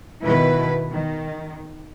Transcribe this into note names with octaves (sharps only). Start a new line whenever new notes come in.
B2 D#3 E4 B4
D#3